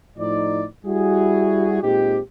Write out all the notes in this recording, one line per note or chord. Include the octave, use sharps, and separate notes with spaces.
A2 F3 D#4 D5
G3 E4 F#4 G#4
A#2 G#3 C4 D#4 G4